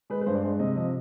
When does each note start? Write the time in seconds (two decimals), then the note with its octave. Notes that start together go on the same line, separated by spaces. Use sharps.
0.10 G#3 B4
0.21 B4
0.26 G2 C5
0.35 D5
0.42 G#3 C5
0.59 C3 D#5
0.76 F3 D#5